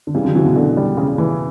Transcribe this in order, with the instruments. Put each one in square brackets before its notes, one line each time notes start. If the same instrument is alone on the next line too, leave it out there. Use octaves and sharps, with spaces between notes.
[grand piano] D3
[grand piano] C#3 E3 [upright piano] G3
[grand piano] D3 F#3
[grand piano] C#3 E3 [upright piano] F#4
[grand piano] B2 D3
[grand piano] B2 [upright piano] D3
[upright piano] G3
C#3
E3